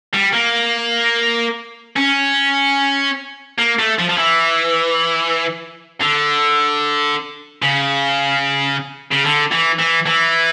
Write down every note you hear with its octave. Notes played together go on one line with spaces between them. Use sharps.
G3
A#3
C#4
A#3
A3
F3
F3
E3
D3
C#3
C#3
D3
E3
E3
E3